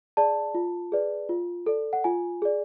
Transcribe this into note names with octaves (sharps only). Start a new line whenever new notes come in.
G#4 D5 A5
F4
G#4 B4 D5
F4
A4 D5
F#5
F4 G#5
G#4 D5